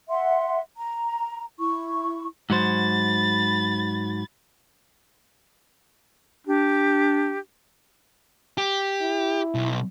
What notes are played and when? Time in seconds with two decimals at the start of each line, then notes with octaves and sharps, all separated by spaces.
0.09 E5 F#5 C6
0.77 A#5
1.59 E4 C#6
2.50 G#2 F#3 C5 B5 A6
6.47 D4 G4
8.58 G4
9.01 E4
9.55 B1